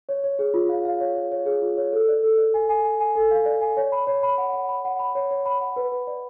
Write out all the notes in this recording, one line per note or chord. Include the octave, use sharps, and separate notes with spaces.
C#5
C#5
G#4
F4
F5
F5
C#5
C#5
C#5
G#4
F4
C#5
A4
D5
A4
D5
G#5
G#5
G#5
G#5
A4
F5
D5
G#5
C#5
B5
C#5
B5
F#5
F#5
B5
F#5
B5
C#5
C#5
B5
F#5
B4
B4
D5